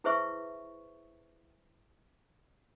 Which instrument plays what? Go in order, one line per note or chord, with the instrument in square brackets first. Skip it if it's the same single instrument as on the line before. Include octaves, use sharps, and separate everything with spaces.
[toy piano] E4 G#4 B4 C5 E5 C#6